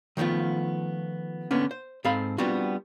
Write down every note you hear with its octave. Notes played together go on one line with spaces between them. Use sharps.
D#3 F3 A3 B3 F4
D3 A#3 B3 C#4
C5
G#2 C4 A4 F5 B5
G3 B3 C4 D4 F4 F#4